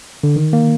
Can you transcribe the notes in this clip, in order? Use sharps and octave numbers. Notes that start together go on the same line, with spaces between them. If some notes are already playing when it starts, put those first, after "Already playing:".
D3
D#3
A#3